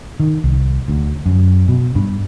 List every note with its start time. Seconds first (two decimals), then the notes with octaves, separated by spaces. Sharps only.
0.20 D#3
0.44 C2
0.88 D2
1.26 F#2
1.68 B2
1.95 G2